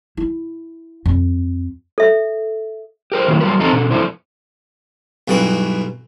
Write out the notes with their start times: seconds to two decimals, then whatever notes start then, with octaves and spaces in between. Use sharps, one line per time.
0.17 E4
1.06 F2
1.98 A4 E5
3.12 G4 A#4 C5
3.28 D#3 F#3 A#3 B3 E4
3.41 F#3 G3 F4 A#4 B4
3.59 E2 F3 C4 D#4 A4 A#5
3.72 B2 D3
3.91 F2 A3 C4 D4 E4 C5
5.28 B1 G2 B2 E3 B5